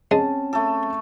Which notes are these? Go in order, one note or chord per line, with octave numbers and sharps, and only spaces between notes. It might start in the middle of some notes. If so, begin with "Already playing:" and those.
G#3 C4 C#4 A5
A3 A4